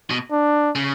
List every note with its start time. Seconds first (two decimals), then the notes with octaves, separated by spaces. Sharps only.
0.10 B2
0.31 D4
0.75 C#3